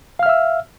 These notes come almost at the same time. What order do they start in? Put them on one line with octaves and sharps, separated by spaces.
F5 F6 E5 E6